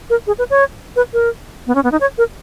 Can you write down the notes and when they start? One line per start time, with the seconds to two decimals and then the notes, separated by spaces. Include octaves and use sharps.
0.10 A#4
0.27 G#4
0.39 B4
0.50 C#5
0.96 B4
1.13 A#4
1.67 B3
1.75 C#4
1.84 B3
1.92 D#4
2.01 C#5
2.18 A#4